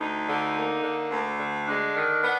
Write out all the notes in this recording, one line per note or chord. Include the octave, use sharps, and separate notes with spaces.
D2 D#4
D3
A#3
D3
D2
D3
G#3 D4
D#3
B3